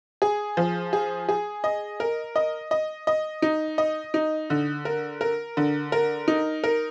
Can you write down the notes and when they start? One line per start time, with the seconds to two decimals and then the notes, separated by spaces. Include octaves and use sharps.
0.22 G#4
0.57 F3
0.93 G#4
1.29 G#4
1.64 D#5
2.00 A#4
2.36 D#5
2.71 D#5
3.07 D#5
3.42 D#4
3.78 D#5
4.14 D#4
4.50 D3
4.85 A#4
5.21 A#4
5.57 D3
5.92 A#4
6.28 D#4
6.64 A#4